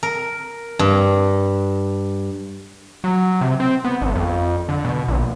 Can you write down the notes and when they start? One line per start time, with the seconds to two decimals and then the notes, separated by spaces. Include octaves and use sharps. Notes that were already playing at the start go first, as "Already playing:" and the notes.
0.03 A#4
0.79 G2
3.04 F#3
3.41 C3
3.60 C4
3.85 B3
4.01 G#1
4.15 F2
4.69 D3
4.85 B2
5.08 A#1